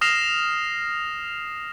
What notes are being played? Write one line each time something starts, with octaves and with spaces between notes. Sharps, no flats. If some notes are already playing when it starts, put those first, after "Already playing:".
D#6 F6 A#6 C7 E7 F7